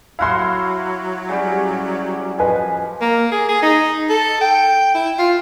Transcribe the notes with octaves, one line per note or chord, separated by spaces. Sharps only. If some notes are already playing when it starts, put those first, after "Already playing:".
F#3 E4 F#4 F5 F#5 C6
C#3 G3 G4
F3 B4 D#5 G#5
A#3
G#4
G#4
D#4
A4
G5
E4
F4